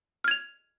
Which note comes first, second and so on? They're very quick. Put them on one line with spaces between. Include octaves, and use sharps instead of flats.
F6 G#6 F7